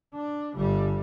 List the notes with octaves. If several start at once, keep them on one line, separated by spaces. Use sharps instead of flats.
D4
G1 G3